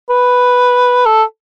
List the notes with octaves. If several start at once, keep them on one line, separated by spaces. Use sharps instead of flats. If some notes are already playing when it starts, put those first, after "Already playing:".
B4
A4